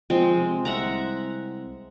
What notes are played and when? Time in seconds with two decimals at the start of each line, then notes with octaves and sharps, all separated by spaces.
0.10 F3 G#3 C4
0.38 C3
0.65 C2 E5 F#5 A#5